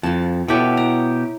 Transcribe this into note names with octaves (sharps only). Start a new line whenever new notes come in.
F2 F3 A5
B2 E4 G4 A4 C#5
A#5